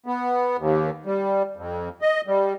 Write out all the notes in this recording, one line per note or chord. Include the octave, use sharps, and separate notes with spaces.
B3
D#2
G3
F2
D#5
G3